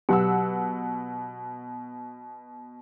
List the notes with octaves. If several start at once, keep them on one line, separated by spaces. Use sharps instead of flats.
B2 F#3 G4 F#5 E6